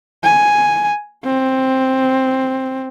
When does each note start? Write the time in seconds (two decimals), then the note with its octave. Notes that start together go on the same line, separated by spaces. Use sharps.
0.24 G#5
1.25 C4